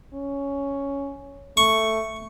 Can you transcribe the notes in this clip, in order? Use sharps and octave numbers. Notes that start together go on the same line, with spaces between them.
C#4
A3 C#6